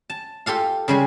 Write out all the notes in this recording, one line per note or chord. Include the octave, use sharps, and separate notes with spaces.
A5
F4 G4 A4 F5
C#3 G3 G#3